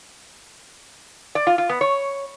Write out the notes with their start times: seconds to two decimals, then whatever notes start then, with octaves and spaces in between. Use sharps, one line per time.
1.35 D5
1.47 F4
1.58 F4
1.69 B3
1.81 C#5